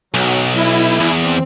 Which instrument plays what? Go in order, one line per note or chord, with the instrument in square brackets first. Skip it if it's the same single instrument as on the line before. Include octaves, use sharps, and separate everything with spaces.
[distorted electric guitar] B1 [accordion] F#3
[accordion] E4
[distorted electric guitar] E2
[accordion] C4